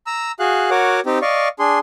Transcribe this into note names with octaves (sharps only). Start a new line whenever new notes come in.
A#5 E6
F#4 G#4 F5 F#6
F#4 A#4 C#5 F#5 D6
C4 D#4 G4
D5 D#5 F5 C#6
D4 G#4 C6